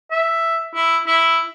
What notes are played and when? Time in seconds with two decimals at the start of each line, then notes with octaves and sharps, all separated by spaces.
0.11 E5
0.75 E4
1.07 E4